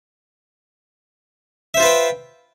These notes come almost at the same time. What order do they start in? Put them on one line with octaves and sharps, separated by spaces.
E5 C5 F4 B4 G5